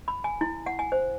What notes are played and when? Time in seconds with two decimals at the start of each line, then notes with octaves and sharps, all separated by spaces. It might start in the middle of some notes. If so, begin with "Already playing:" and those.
0.08 B5
0.24 G#5
0.41 E4
0.66 F#5
0.79 G#5
0.92 C5